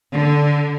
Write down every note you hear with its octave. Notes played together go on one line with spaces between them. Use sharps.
D3